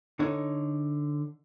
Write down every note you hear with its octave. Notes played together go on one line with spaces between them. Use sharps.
D3 D#4 C#5